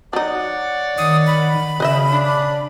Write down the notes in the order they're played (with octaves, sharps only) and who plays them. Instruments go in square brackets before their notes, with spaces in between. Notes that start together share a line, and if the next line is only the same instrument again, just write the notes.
[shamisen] F#3 D#4 [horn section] C#5 D5 F#5
[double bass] D#3 [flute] D#6
[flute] B5
[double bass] C#3 [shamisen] B4 D#5 E5
[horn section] D4